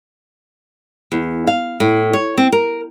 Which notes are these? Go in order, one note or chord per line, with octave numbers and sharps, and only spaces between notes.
E2
F5
A2
C#5
C4
A#4